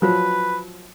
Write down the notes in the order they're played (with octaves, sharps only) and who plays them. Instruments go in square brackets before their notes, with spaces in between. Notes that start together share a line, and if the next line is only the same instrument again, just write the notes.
[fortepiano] F3 F#3 [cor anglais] B4